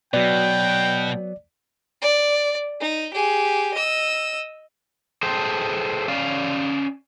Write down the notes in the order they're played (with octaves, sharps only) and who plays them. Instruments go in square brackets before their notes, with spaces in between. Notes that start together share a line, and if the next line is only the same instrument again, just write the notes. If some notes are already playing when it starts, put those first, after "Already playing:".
[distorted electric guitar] B2 [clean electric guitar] F#3 B3 [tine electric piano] D5 [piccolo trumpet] G5
[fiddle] D5
D#4
G4 G#4
D#5 E6
[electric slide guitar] G#4 A4 C5 G5 A5
C#4 D5 F5